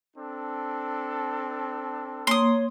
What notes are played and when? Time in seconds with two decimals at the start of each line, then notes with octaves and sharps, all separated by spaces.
0.16 C4 D4 A4
2.27 A#3 C#5 C6 D#6